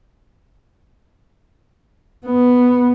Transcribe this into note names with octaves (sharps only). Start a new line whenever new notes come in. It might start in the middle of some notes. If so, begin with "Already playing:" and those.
B3